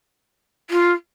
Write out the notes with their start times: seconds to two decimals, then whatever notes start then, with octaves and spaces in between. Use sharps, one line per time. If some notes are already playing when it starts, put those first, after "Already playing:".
0.70 F4